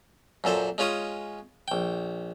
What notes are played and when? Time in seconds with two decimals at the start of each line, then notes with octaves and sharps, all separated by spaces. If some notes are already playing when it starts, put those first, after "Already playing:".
0.44 F#2 A#2 A4 C5
0.78 G#3 C#4 F4 C#5 D#6
1.68 A#1 G5